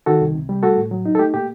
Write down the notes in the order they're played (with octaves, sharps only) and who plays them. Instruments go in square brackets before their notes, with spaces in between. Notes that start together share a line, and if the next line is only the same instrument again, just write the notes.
[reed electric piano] D#3 F#4 A4
C2
C3
G3
A3 F#4 A4
A2
F#3
D#4
A4
A3 G4
A#2 G4